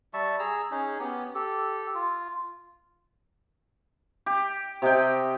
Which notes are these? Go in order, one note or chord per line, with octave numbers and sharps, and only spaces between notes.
G3 E5 A5 C#6
G#4 A#5 E6
C#4 D#4 G#4
B3 C#4 G4
G4 A4
F4
G4
C3 D#5 G5